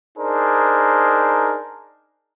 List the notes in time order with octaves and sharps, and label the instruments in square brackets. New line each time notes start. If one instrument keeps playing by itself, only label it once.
[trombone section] D4 D#4 G#4 A#4 C5